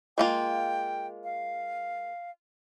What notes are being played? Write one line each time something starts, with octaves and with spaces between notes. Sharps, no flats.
G#3 A#3 F4 G5
F5